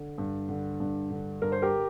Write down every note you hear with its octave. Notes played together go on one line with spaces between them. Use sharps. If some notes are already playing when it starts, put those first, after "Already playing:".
Already playing: D3
G2
D3
G2
D3
G2 A#4
C5
G4 A#4